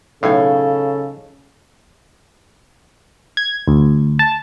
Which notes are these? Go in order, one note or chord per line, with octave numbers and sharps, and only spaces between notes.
B1 A2 C#3 D#4 A4 C#5 F5
G#6
D2
A5